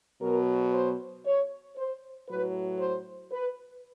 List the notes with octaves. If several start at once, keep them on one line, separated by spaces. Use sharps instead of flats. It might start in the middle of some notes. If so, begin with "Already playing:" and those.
B2 F#3 A#4
C5
C#5
C5
A2 F#3 B4
C5
B4